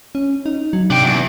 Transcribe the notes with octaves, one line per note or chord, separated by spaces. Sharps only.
C#4
D#4
F#3
C3 D4 G5
E2 F#3
B3